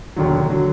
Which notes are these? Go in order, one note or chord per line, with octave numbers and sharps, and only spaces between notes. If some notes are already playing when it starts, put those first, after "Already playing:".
E1 D#2 D3 F#3
D3 F#3